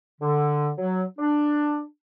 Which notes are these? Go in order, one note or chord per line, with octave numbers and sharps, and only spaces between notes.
D3
F#3
D4